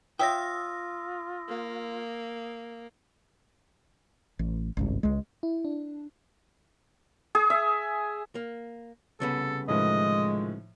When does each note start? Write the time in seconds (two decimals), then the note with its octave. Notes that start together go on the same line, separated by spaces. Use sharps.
0.19 F4 C#5 E5 G5 D#6 E6 A#6
1.48 A#3
4.39 A1
4.77 G#1 C#2 G2
5.03 C#2 G#3
5.43 E4
5.65 D4
7.35 G#4
7.50 E5
8.35 A#3
9.20 C2 C#3 B3 A4
9.68 A2 D#3 F3 G#3 D#5